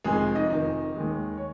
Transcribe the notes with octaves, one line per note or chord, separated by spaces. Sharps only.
F1 F2 D#3 G#3 G#4
D#4 D#5
F1 F2 D#3 D#4 D#5
D#2 D#3 G#3
C#5